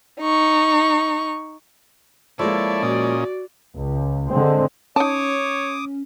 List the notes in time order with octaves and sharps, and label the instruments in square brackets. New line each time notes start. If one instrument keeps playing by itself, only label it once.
[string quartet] D#4 C#6
[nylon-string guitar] F3 G#3 A#3 [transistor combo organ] E4 A4 C#5 [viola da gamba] D5
[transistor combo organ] A#2 C#4 D#5 [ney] F#4
[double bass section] C#2
D3 G#3 C4
[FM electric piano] C#4 [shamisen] D#4 A5 [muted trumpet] C#5 [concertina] D6 D#6